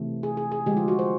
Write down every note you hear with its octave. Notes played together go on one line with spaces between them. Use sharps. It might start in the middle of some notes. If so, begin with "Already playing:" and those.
Already playing: C3 E3 A3
G#4
G#4
G#4
D3 F3 G#3 G4
F4
F#4
C5